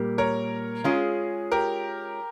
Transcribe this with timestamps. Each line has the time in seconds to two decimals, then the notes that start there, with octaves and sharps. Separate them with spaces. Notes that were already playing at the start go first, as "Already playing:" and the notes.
Already playing: A#2 G3 A#3 G4
0.18 A#4 C#5
0.84 G#3 C#4 F4 G#4
1.52 G4 A#4